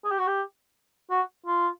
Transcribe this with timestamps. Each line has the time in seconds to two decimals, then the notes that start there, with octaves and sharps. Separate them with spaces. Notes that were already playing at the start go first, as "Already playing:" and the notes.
0.04 G#4
0.11 G4
0.19 F#4
0.27 G4
1.10 F#4
1.46 F4